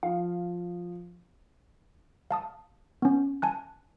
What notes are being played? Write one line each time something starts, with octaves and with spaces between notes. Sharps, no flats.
F3 F5
F5 A5 D#6
B3 C#4
G#5 A5 F#6